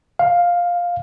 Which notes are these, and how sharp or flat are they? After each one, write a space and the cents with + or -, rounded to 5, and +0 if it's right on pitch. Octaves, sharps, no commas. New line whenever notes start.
F5 +10